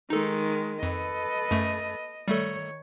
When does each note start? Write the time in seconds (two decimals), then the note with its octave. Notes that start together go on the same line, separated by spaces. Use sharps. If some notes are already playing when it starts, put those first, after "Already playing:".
0.10 D#3 G#3 D#4 A4
0.83 F2 A4 B4 D#5
1.51 F#2 A3
2.28 D#3 G3 A3 A4 C#5